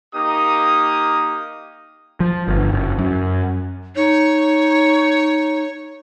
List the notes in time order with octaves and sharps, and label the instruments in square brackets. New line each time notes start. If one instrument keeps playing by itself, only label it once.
[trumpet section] A#3 D#4 G4 D#6
[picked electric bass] F3
G1
F#1
F#2
[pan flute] D#4 [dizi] C#5